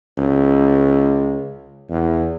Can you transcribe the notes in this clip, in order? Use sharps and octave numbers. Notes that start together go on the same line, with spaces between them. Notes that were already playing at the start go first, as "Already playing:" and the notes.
C#2
E2